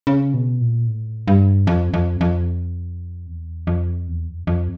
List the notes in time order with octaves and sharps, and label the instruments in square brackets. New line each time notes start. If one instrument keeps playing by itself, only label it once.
[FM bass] C#3
B2
A#2
A2
G2
F2
F2
F2
E2
F2
E2
F2
F2